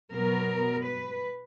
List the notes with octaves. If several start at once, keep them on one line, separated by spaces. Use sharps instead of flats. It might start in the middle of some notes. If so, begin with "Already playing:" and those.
B2 F#3 B3 A#4
B4